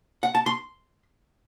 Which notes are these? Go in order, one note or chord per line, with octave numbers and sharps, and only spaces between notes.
F#5
A5
C6